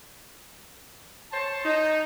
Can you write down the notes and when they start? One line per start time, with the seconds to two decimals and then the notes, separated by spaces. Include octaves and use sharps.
1.32 C5 C#5 A5
1.64 D#4